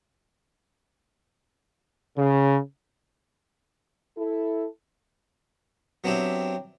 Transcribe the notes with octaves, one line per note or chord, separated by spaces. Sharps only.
C#3
E4 A4
F#3 B3 C4 D4 E4 G4